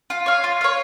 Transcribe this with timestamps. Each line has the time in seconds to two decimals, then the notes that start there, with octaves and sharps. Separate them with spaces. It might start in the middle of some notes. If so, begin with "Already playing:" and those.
0.10 F4
0.26 C#5 F5
0.44 F4
0.61 C#5 F5